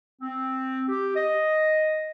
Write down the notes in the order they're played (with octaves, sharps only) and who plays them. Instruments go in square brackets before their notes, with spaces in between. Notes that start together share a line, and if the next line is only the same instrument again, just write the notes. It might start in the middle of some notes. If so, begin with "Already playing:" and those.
[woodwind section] C4
G4
D#5